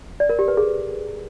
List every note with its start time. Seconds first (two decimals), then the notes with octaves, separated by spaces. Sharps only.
0.20 D5
0.29 A#4
0.39 G4
0.48 B4
0.57 G#4